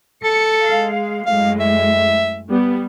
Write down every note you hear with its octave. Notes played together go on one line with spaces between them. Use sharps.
A4 C#7
G#3 F5
F#2 A2 G#3 F5
E5
G3 B3